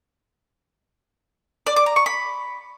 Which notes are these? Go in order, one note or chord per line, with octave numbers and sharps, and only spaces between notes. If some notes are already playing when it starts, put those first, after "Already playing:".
D5
D6
A#5
C#6
B5